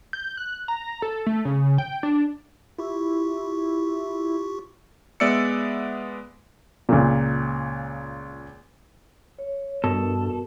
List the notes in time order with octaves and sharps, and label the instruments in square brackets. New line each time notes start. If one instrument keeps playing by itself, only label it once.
[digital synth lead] G6
F#6
A#5
A4
A3
C#3
G5
D4
[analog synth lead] E4 [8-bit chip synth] F4 G4 C#6
[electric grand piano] G#3 B3 D5 E5 E6 C#7
[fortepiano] C#2 A#2
[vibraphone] C#5
[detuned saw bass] G2 [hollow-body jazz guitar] B2 [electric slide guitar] A4 [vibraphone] A#4